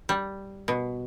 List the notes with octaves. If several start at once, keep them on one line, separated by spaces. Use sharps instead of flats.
G3
B2